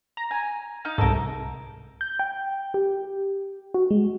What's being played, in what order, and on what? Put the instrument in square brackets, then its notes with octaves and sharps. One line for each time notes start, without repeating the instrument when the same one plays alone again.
[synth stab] A#5
[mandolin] G#5
D#4 F5
[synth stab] C2 G#2 [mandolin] A4 A#4
[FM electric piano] G6
G5
G4
F#4
G#3